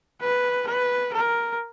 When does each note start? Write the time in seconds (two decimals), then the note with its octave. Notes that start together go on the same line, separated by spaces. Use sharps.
0.21 B4
0.67 B4
1.13 A#4